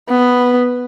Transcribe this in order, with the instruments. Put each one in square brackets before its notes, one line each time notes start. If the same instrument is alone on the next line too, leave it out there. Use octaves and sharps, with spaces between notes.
[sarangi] B3